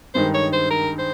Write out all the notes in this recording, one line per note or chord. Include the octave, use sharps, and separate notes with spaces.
G2 D#3 G#3 D#4 G4 C5
C#5
C5
A#4
C5